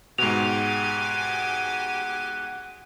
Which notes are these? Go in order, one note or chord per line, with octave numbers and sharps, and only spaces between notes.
G#2 B2 G4 F#5 G#5 F7